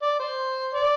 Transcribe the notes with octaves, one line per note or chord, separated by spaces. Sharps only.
D5
C5
D5